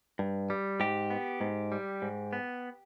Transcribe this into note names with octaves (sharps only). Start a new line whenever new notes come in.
G2
G3
G#2 G4
B3
G#2
G3
G#2
B3